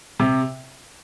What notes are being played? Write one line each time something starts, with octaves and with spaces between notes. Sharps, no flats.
C3